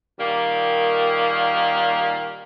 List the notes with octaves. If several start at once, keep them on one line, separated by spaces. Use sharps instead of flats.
A#2 D#3 G3 A#3